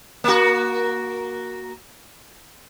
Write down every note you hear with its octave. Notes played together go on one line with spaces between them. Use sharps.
A#3 F#4